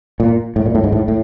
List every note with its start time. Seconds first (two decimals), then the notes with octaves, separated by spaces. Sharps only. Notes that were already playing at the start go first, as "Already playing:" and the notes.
0.20 A#2
0.56 A2
0.66 A#2
0.75 A2
0.84 G#2
0.92 A2
1.08 A2